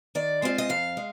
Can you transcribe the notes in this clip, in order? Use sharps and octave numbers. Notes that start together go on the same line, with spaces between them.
D#3 D5
G#3 C4 F4
D#5
F2 F5
G#3